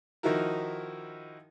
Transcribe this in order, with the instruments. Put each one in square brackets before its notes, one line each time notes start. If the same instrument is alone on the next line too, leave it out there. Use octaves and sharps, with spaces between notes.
[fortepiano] D#3 F3 D#4 E4 F#4 A#4